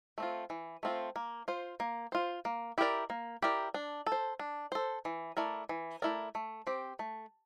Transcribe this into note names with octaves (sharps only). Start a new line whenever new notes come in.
A3 C4 F4
E3
A3 C4 F4
A#3
F4 C5
A#3
F4 C5
A#3
E4 G4 A#4 D5
A#3
E4 G4 A#4 D5
D4
A4
C5
D4
A4 C5
E3
A3 E4 A#4 D5
E3
A3 E4 A#4 D5
A3
C4 G4
A3